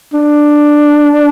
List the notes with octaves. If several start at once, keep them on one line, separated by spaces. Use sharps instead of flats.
D4